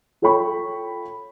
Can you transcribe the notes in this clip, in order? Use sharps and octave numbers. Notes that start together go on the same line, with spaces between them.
F4 A4 C#5 G5 B5 C#6